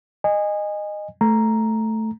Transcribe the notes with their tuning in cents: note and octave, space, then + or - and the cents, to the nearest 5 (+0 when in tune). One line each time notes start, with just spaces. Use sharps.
D#5 -15 G#5 -20
A3 +0 A#5 +0